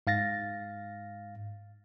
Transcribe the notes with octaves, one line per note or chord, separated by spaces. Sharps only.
G#2 F5 A6 A#6